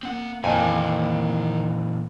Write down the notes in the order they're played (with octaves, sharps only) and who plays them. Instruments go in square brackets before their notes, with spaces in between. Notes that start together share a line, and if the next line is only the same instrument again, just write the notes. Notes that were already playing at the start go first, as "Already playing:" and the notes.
[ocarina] A#3 [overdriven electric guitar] C4 F#5
[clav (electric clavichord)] F2 [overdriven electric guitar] A#2 E3 [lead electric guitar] D#3 G#5